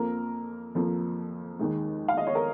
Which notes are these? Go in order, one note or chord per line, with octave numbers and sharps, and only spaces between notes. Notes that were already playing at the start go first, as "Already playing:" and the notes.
Already playing: F2 F3 A#3 A#4
F2 F3 A#3
D#2 D#3 G#3
F5
D#5
C#5
A#4